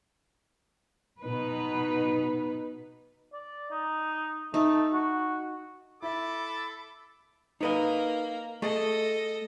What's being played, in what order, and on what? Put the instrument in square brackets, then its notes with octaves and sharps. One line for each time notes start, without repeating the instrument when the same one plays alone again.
[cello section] B2 D#4 B4
[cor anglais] D5
D#4
[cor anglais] A3 [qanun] D#4
[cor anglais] F#4
[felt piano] E4 [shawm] A4 [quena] B5 [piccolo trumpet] D6
[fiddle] A#3 A#4 [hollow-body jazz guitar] D#4 B4 D#5
[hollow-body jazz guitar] A3 G#4 [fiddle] A4 D#5